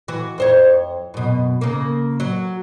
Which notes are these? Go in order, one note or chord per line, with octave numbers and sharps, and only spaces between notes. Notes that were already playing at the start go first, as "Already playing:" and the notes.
E3 F#4
F2 C5 C#5
F#2 B2
C#3 A#3
F#3